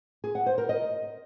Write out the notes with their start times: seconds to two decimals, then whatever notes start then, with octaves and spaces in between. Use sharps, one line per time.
0.24 G#4
0.35 F#5
0.46 C5
0.58 A#4
0.69 D#5